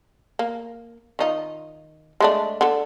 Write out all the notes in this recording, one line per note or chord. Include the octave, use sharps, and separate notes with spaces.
A#3
D#3 D#4 F4
G#3 A3 D4
D3 A4